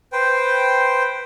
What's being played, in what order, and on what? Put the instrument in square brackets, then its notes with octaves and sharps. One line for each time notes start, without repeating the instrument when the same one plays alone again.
[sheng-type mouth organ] B4 C5 G5